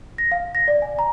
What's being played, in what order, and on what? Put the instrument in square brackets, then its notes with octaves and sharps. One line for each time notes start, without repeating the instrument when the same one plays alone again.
[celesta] A#6
F5
A#6
D5
G#5
A#5